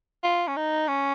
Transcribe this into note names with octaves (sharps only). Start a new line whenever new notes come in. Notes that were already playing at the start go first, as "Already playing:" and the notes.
F4
C#4
D#4
C#4